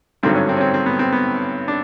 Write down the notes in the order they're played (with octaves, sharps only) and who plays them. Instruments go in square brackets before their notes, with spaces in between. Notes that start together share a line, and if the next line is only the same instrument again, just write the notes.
[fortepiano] G#1 G2 D3 F#3 C4
C#4
C4
C#4
C4
C4
B3
C4
B3
D4